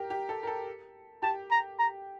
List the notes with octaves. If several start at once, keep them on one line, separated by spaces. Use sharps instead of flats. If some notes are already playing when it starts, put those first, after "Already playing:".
Already playing: G4 A#4
G4
A4
A#4
A4
G4 A5
A#5
A#5